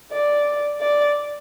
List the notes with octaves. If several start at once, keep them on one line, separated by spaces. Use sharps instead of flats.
D5
D5